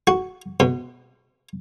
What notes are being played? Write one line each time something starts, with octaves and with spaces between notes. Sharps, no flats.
F#4
B2